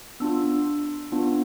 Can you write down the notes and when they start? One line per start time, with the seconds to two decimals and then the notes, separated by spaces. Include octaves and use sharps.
0.20 B3 D4 F4 E6
1.12 B3 D4 F4